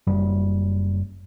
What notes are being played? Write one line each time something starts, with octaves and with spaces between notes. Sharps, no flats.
F#1 F#2 G3